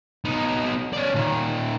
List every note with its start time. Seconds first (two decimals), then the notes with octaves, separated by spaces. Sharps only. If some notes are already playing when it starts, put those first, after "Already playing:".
0.25 B3 D#4
0.93 C#4 D5
1.14 A#2 D#3